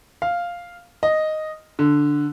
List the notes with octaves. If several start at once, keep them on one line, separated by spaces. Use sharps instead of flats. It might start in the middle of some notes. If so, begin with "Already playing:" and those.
F5
D#5
D3